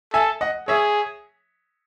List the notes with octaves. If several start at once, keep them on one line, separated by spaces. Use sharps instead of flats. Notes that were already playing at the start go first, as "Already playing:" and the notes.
A4 E5 G#5
D#5 F#5
G#4 C#5 E5